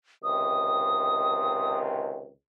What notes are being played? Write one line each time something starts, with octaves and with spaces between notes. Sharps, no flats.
C#2 C3 D#3 D#6